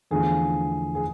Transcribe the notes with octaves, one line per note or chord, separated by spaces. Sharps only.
E2 D3 F3 A3 G#4
G#4